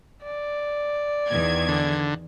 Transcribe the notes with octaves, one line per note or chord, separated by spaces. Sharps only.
D5
E2 D#3 G#6
D3